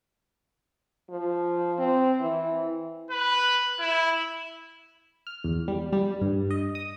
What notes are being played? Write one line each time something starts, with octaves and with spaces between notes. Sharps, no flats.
F3
C4
E3
B4
E4
F6
E2
G3
G3
G2
D#5
D#6